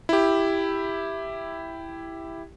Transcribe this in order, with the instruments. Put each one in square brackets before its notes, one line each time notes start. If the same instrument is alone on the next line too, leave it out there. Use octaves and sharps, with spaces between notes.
[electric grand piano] E4 G4